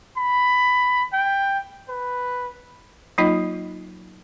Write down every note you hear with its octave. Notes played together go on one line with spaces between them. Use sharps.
B5
G5
B4
F#3 A#3 D#4 F4 D#5